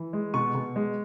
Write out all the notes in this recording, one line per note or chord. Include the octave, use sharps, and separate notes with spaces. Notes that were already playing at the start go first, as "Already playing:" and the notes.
Already playing: E3
G#3
B2 C#6
B2
G#3